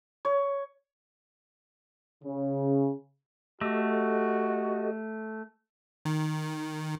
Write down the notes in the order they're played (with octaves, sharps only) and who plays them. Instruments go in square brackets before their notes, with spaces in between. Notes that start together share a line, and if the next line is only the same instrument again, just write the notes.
[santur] C#5
[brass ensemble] C#3
[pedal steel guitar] A3 [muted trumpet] F#4 [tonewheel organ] G4 A4 D#5
[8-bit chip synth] D#3